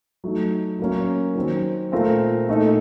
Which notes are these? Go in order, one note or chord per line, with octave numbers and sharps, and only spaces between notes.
F#3 A3 D#4
F#3 A#3 C#4
D#3 F#3 C4
A#2 A3 C4 F4 A#4
A#2 A3 D#4 A4